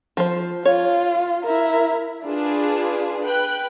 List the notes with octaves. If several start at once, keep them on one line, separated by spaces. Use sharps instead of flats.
F3 C5
F4 C#5
E4 A#4
D4 F4 G#4 B4
B4 G5 F#6